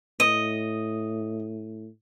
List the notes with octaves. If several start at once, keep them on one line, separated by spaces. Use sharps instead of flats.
A2 D#5 D#7